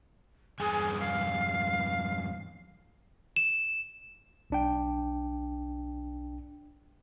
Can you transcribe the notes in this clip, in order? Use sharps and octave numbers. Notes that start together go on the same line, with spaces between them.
E2 G2 G#4 G#5
F5
E7
B1 D4 G5